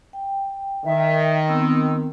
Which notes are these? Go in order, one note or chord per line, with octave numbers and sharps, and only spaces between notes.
G5
D#3 E5
B3 C4 E6